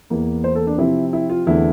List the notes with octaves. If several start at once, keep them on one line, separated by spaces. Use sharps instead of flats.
E2 E3 A#3
C5
A4
D4
C3 F3 C4 E4
E4
F4
E2 D3 A3 C4 E4